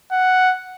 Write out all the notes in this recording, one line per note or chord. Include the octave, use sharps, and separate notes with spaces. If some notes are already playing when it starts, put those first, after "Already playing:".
F#5